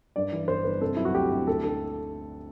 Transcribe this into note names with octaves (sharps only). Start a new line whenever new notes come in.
G2 D5
E3
G1 C5
G1 B4
C3 A4
F#3 E4
F#4
D2 G4
D2
D2 A4
D3 A4